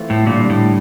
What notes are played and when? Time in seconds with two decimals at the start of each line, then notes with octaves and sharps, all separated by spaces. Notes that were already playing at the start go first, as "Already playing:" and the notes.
Already playing: E3 A3 C4 F4
0.10 A2
0.27 A#2 D3 G3 D4
0.50 A2